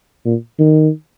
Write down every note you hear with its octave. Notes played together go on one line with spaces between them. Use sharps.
A#2
D#3